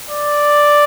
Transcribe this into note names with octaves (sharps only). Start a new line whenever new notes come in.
D5